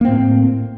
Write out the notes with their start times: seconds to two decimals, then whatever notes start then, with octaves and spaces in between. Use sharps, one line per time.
0.01 A#3
0.05 C4
0.08 A2